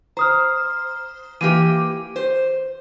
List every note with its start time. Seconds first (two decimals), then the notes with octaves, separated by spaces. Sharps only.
0.17 C5 A#5 D#6 F6
1.41 E3 A#3 G4 D#7
2.16 C5